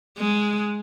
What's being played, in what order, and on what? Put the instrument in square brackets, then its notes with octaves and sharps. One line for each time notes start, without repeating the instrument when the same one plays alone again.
[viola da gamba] G#3